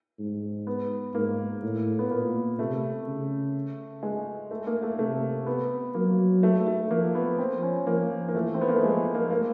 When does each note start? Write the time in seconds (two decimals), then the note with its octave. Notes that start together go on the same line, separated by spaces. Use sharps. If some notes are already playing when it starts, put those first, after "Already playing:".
0.19 G#2
0.67 B3
1.14 G#2 A#3
1.62 A2
1.99 B3
2.11 A#2 A#3
2.59 C3 A3
3.07 C#3
4.03 G#3
4.51 A3
4.67 A#3
4.82 A3
4.99 C3 A3
5.46 B3
5.94 F#3 A#3
6.43 A3
6.67 A3
6.90 F3 A#3
7.15 B3
7.39 C4
7.63 C#4
7.87 F3 A#3
8.28 A#3
8.34 E3 A3
8.54 C4
8.61 B3
8.68 A#3
8.75 A3
8.83 F3 G#3
9.15 A#3
9.30 A#3